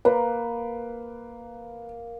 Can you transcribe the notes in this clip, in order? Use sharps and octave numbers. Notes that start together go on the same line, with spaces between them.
A#3 B4